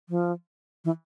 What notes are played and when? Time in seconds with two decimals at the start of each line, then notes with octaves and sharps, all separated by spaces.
0.09 F3
0.85 E3